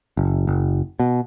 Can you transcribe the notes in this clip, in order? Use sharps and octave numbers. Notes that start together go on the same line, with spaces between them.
F#1
F#1
B2